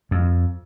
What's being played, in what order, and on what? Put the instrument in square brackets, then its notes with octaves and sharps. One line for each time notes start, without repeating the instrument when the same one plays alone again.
[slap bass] F2